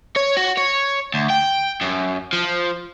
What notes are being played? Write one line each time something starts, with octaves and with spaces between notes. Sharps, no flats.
C#5
F#4
C#5
D2
G5
F#2
F3